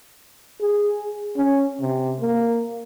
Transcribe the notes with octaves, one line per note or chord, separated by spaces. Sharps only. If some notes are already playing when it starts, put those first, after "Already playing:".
G#4
C#4
C3
A#3